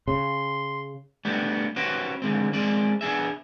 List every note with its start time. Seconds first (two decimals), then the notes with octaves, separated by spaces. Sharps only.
0.08 C#3 C6
1.25 A3 B3 D4 G4
1.76 C#4 F#4 G4 B4 C5
2.22 D3 G#3 C4
2.53 G#3 C4 D5
3.01 B3 D4 G#4 E5